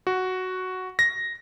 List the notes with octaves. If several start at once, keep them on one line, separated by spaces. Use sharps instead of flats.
F#4
A#6